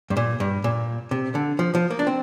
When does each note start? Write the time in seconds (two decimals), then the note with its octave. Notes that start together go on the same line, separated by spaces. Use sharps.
0.10 G2
0.17 A#2
0.40 G2
0.64 A#2
1.11 C3
1.35 D3
1.59 F3
1.75 F3
1.91 A#3
1.99 D4
2.07 C4